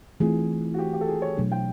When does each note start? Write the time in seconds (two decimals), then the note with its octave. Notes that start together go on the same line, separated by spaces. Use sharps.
0.20 E3 A3 C4 F4 G#4
0.74 F#4
0.79 G4
0.93 G4
1.01 A4
1.07 G#4
1.22 C#5
1.37 B2 F#3 A3 D4
1.52 G5